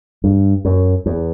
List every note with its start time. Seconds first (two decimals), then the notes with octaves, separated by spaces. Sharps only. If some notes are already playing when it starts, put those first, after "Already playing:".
0.24 G2
0.65 F#2
1.06 E2